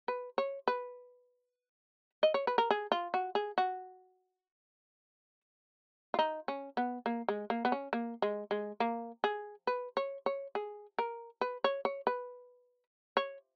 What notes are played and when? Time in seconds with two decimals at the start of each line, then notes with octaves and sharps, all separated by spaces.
0.08 B4
0.38 C#5
0.68 B4
2.23 D#5
2.34 C#5
2.47 B4
2.58 A#4
2.71 G#4
2.92 F4
3.14 F#4
3.35 G#4
3.58 F#4
6.14 F4
6.19 D#4
6.48 C#4
6.77 B3
7.06 A#3
7.28 G#3
7.50 A#3
7.65 B3
7.72 C#4
7.93 A#3
8.22 G#3
8.51 G#3
8.80 A#3
9.24 G#4
9.67 B4
9.97 C#5
10.26 C#5
10.55 G#4
10.98 A#4
11.41 B4
11.64 C#5
11.85 C#5
12.07 B4
13.17 C#5